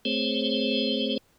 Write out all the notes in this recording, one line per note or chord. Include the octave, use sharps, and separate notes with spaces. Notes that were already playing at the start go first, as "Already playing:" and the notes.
A3 C4 G#4 C5 C#5